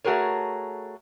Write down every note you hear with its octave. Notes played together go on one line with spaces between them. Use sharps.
A3 F#4 G#4 A#4 C#5